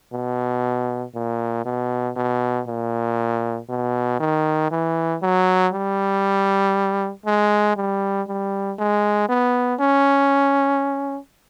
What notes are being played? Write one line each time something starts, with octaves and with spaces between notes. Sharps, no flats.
B2
A#2
B2
B2
A#2
B2
D#3
E3
F#3
G3
G#3
G3
G3
G#3
B3
C#4